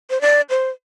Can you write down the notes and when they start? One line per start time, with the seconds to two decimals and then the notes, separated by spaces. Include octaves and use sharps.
0.10 C5
0.21 D5
0.50 C5